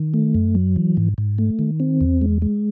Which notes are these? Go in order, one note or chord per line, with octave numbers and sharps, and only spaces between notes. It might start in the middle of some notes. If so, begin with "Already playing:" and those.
Already playing: D#3
A3
F#2
F#3
E3
G#2
G#2
A3
D#3
C4
E2
G#3
G#3